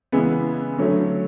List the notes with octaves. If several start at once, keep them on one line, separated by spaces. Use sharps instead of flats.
C#3 E3 G#3 B3
D3 F#3 A3 C#4